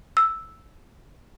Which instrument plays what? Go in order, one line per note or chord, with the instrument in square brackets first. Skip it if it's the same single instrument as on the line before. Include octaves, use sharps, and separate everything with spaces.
[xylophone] E6